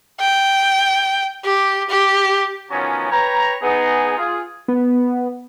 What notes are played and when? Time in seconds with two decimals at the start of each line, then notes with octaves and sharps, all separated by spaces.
0.20 G5
1.45 G4
1.90 G4
2.71 D#3 F3 F#3 B3 C#4
3.11 B4 C#5 G5 A#5
3.62 B3 D#4 G#4
4.18 F4 G#4
4.68 B3